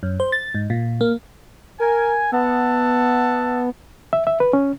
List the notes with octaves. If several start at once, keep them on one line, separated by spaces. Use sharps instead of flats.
F#2
C5
A6
G#2
A#2
A#3
A#4 G#5
B3 E5 F#5 A5
E5
E5
B4
C#4